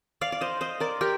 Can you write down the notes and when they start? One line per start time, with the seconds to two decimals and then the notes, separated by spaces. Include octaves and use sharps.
0.21 D5 F5
0.32 D5
0.41 C5 D#5
0.61 C5 D#5
0.80 A#4 D5
1.01 G4 A#4